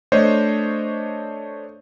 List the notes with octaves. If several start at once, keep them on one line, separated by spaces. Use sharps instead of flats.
A3 D4 C5 C#5 D#5